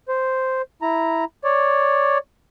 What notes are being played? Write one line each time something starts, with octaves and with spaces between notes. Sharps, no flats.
C5
E4 A#5
C#5 D5